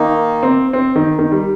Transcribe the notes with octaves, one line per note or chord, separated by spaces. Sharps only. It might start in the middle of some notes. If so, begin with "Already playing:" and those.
Already playing: D#3 A#3 D#4
C4
C4
D#3
D#3
G3